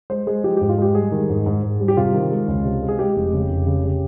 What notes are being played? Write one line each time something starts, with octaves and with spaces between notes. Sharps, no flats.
G#3 C5
G#3 G#4
F3 G4
G#2 G4
F4
G#3 G4
G3 G#4
D#3
G#2
G#2
G#2
G3
G4
C3 F4
D#3
G#3
C#2
C3
G#3
G#4
G#3 G4
F1
C#3
F1
C#3
C#3